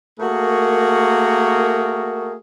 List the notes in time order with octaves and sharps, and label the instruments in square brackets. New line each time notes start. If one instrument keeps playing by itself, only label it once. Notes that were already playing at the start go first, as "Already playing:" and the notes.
[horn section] A3 A#3 F#4 G#4 A#4